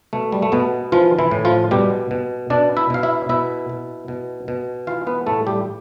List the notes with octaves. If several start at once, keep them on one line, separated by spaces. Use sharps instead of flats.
B2 A3
G3
A3
B2 B3
E3 F3 F4
E3 E4
A2
F3 F4
B2 G3 G4
B2
B2 D4 D5
E4 E5
B2 F5
E4 E5
B2 E4 E5
B2
B2
B2
E3 F4 F5
B3 B4
A2 A3 A4
G3 G4